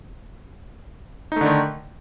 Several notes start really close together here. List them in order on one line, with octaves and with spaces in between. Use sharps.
D#4 A3 D3 D#3